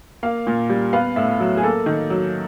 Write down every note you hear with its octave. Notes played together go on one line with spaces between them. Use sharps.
A#3 F5
A#2
G3
B3 F5
A2 E5
F#3
G#4
A#3 A4
D#3
F#3